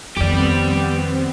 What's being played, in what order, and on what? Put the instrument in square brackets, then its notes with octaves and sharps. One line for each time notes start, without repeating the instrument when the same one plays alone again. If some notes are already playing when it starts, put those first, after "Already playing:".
[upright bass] F2 D#3 [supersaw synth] B3 C4 [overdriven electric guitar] G4 D5